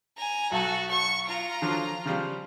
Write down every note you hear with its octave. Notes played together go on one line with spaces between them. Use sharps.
G#5 A#5
B1 F#4 A4 A5
C#6 C#7
F4 A#5
D3 F3 F#3
C#3 F3 G3